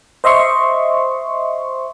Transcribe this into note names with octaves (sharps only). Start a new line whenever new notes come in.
C5 D#5 E5 C6 C#6